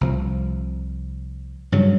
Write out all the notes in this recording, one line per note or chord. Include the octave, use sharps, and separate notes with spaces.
C2 F3
G2 C#3 F#3